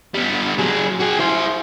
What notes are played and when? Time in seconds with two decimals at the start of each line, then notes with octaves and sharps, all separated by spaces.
0.14 G3 B3
0.59 F#3 G#4
1.00 F#4 G#4
1.19 E4 C5